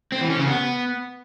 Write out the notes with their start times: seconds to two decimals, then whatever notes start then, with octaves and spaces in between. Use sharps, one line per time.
0.12 C4
0.21 E3
0.30 C#4
0.39 C#3
0.47 B3